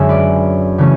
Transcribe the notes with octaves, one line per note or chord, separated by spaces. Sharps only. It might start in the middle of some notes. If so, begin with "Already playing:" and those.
Already playing: F#2 D3 G#3 C#4 E5 G#5
B4 D5
C#3 E3 A3 C#4